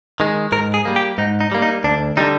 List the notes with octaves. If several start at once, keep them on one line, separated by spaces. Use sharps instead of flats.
D#3 G#3
G#2 A#4
G#4
G3 A#3
G4
G#2 D#4
D#4
G3 A#3
D#4
D2 D4
D3 G3 D#4